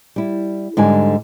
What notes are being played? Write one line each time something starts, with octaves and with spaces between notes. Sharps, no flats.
G3 E4
G#2 D3 G3 G#5